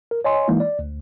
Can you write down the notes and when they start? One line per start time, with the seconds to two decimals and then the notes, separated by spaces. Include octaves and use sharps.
0.11 A#4
0.25 C#5 D#5 G#5 C6
0.48 E3 G#3 A#3 D#4 E4
0.60 D5
0.79 D2